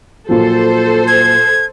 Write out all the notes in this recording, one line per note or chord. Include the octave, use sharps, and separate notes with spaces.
A#2 F3 F#3 A4 C5
G#6